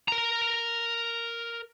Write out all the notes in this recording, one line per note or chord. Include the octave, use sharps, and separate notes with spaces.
A#4 A#5